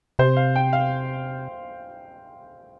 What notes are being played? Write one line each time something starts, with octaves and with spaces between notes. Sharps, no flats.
C3 C5
F5
G5
F5